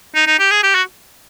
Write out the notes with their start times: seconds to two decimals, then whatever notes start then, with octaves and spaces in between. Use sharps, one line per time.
0.15 D#4
0.27 D#4
0.39 G4
0.51 G#4
0.63 G4
0.75 F#4